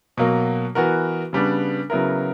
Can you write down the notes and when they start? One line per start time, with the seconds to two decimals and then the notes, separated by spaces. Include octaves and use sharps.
0.17 B2 F#3 A#3
0.75 E3 B3 F#4 A#4
1.33 C#3 G3 B3 D4
1.90 C#3 F#3 B3 E4 A#4